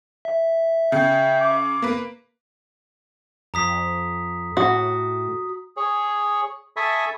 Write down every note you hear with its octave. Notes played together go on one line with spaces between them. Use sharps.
E5
C#3 G5
D6
A#3 B4
F2 A#5 D#6 B6
A2 F#4 D#6
G#4 C#5
A4 E5 G#5 B5 C#6 D#6